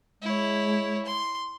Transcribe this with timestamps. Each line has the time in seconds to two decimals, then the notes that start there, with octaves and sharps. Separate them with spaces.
0.22 G#3 E4 C#5
1.06 C6